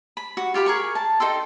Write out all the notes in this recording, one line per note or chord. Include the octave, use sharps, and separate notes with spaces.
B5
F#4
F4 G4 F5 B5
G#4 A#4 C#6
A5
D#4 A4 G5 C6